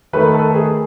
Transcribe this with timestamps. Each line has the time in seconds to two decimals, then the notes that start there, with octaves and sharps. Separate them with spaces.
0.13 D#3 A3 B4
0.34 A4
0.54 G#4